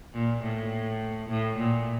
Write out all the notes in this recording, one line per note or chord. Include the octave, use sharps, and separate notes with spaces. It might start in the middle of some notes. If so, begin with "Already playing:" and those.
A#2
A2
A2
A#2